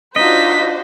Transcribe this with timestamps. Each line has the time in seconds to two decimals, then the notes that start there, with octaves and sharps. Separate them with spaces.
0.16 D4 D#4 F4 F#4 C5 D#5 B6